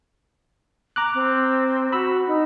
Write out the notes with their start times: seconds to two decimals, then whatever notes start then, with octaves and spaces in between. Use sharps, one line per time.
0.96 A#5 D6 F#6
1.14 C4
1.92 F#4 B5 E6
2.27 D#4